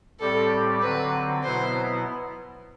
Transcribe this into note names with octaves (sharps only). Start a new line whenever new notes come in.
A2 G3 C4 G4 A4 D5
D3 F#3 C4 B4
B2 F#3 B3 E4 C5